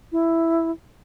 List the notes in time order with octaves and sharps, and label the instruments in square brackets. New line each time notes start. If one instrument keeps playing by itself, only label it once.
[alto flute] E4